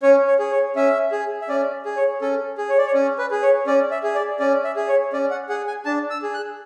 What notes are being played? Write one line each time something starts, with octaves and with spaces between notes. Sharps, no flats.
C#4 C#5
C#5
G#4
C#5
C#4 E5
G#4
E5
C#4 D5
G#4
C#5
C#4 A4
G#4
C#5
D5
C#5
C#4
B4
G#4
C#5
C#4 D5
E5
G#4
D5
C#4 D5
E5
G#4
C#5
C#4 D5
F#5
G#4 F#5
G#5
D4 A5
E6
G#4
F#6